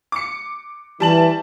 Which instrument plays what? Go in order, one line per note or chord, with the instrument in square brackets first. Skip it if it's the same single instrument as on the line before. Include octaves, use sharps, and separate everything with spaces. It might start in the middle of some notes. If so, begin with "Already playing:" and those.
[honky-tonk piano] D6 C#7
[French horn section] E3 [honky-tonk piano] G3 A5 F#7